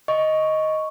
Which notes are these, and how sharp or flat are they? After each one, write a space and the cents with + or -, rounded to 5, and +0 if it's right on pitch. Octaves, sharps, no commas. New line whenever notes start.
D#5 +5 C#6 +0